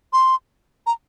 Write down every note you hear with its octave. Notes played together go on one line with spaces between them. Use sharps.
C6
A#5